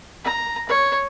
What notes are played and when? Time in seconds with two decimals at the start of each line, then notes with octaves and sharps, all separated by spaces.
0.24 A#5
0.69 C#5